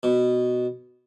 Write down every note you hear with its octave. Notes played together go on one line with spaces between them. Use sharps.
B2